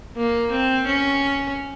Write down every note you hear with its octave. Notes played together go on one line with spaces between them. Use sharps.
A#3
C4
C#4